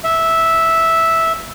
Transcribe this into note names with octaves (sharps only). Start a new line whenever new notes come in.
E5